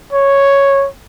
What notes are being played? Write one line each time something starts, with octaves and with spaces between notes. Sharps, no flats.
C#5